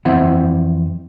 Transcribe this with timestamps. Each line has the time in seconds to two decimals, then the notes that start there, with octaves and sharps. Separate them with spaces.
0.05 F2 E3 C4 E4 E5 F#5